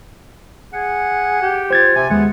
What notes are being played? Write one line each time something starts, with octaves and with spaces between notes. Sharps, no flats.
G#4 F#5
G4
F4 C5 G#6 A6
C3 G#5
D#2 G#3 B3 F#5